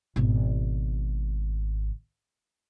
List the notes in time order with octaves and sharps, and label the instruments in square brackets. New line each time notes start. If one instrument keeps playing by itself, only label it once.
[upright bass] G#1 B2